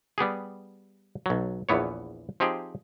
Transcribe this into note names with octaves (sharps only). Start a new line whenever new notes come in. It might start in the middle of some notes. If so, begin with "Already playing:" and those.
G3 B3 G4 G#4
B1 F#3
A#1 E2 E3 B3 C#5
F3 C4 D#4 G4 G#4